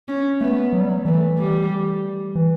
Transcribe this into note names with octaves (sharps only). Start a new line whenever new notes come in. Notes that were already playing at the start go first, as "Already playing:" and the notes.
C#4
A3 B3
F#3
G3
F#3
E3 A3
G3
E3